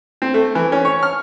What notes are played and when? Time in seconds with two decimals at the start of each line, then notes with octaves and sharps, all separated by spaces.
0.22 C4
0.34 A3
0.55 E3
0.72 C#4
0.85 C#5
1.03 F6